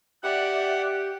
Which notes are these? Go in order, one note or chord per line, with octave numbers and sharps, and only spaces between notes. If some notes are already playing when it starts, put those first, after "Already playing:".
G4 D5 E5 F#5